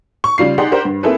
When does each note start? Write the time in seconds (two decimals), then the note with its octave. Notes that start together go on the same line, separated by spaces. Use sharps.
0.24 C#6
0.38 C#3 G3 F4 C7
0.58 D#4 G4 G#4 D5 F#5 C6
0.71 D4 G4 A#4 C5 F#5
0.85 G2
1.03 A#3 C4 E4 G#4 A4 B4